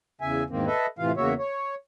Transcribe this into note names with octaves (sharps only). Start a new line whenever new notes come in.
E2 C#3 E5 G#5
E2 G#2 D#3 A#3 C4
A4 B4 D#5 E5
A2 C3 E3 F4 F5
E2 C#3 A#3 F#4 C#5 E5
C#5